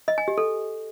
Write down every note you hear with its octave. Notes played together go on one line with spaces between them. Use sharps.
D#5
G#5
G4
A4